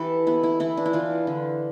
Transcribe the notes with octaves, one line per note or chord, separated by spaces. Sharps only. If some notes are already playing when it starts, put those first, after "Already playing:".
Already playing: E3 G4 A4 B4
B3 E4
E4
E3 E4
D4
E4
E3 F4
D3